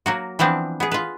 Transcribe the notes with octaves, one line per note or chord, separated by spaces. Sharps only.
F#3 A#3 F#4
E3 F3 B3 C4 D4
B3 G#4
F4 B4